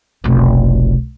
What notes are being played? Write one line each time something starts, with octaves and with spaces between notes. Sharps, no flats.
F1 B1